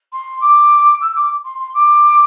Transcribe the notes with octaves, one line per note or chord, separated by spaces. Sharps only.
C6
D6
E6
D6
C6
C6
D6